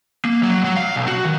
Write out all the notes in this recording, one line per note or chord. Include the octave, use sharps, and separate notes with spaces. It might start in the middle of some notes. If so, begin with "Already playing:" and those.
A#3
F#3
F#3
F5
B1
F#4
D#3